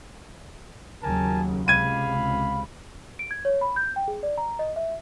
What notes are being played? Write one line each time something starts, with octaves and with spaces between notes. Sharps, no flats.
D#2 C#3 F#3 A#4 G#5 A5
C#2 C3 F5 B5 G#6 D#7
D7
G#6
C#5
B5
G6
G5
G#4
D5
A#5
D#5
E5